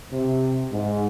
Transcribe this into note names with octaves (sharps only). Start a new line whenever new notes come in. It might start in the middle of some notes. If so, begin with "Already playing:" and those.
C3
G#2